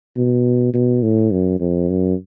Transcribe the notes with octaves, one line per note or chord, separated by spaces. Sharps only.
B2
B2
A2
F#2
F2
F#2